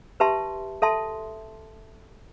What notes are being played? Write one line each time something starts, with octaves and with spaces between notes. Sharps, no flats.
G4 B4 E5 A5 C6
A4 E5 A5 C6